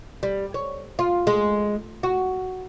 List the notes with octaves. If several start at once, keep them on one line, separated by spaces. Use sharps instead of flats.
G3
C#5
F4
G#3
F#4